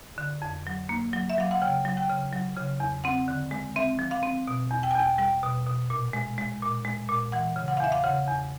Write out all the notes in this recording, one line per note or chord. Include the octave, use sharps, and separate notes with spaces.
D3
F2
F#3
A#3
F#3
E5
F#3 F5
F#5
C#3 G5
F#3
G5
C#3
F#3
C#3
E2
C4 F#5
D3
G#3
C4 E5
F3
F5
C4
B2
E2
G5
G#5
E2 G5
G3 G5
B2
B2
A#2
G#3
G#3
A#2
G#3
A#2
E3 F#5
C#3
F#5
F5
E2 E5
F5
C#3 F#5
E2